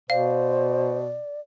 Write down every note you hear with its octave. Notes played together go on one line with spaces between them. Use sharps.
B2 C5 D5 F5